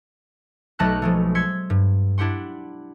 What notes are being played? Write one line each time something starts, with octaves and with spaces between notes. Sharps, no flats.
B1 A3 D#5 A5 B5 F#6
F3 G#3 A3
C6 E6 G#6 B6 C#7
G2
D4 E4 G4 F#5 C6